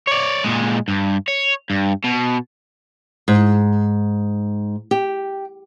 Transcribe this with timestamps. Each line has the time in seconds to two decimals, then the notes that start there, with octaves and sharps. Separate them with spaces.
0.07 C#5 D5
0.44 A#2 G#3
0.88 G2
1.28 C#5
1.70 G2
2.04 B2
3.28 G#2
4.91 G4